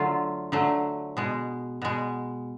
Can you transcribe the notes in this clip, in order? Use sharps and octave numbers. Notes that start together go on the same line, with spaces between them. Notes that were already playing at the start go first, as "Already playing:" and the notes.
Already playing: D3 F#3 A3 F4
D3 F#3 A3
B2 G#3
B2 G#3